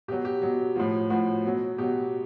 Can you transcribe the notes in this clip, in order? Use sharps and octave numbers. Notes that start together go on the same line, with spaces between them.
B2 F#3 G4
G4
B2 F#3
A2 F3 F#4
A2 F3 F#4
B2 F#3
B2 F#3 G4